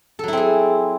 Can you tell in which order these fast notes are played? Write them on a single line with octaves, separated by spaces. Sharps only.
A4 F#3 E4 C4 G#4